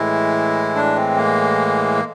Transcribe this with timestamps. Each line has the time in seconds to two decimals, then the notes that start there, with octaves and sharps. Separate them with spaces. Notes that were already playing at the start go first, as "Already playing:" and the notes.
Already playing: A2 E3 G#3 E4
0.75 D4
0.96 C4
1.17 A#3